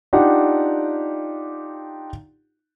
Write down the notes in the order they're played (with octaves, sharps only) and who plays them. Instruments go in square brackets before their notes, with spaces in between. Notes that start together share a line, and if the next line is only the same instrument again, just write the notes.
[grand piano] D4 D#4 F4 G4 F#5